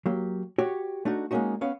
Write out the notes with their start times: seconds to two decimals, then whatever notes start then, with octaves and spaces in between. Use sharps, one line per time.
0.06 F#3 A#3 G4
0.58 F#4 G4 C#5
1.05 A3 D4 D#4 F#4
1.31 G#3 A#3 C4 C#4 D#4 F#4
1.61 B3 C#4 F5